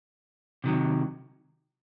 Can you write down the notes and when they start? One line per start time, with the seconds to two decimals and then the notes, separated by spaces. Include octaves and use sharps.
0.64 C3 D#3 F#3